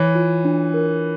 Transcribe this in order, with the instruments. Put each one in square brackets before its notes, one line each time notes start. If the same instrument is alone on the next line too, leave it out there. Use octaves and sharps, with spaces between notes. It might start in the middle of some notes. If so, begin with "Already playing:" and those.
Already playing: [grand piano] E3 [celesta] C#5
[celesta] F4
D4
A#4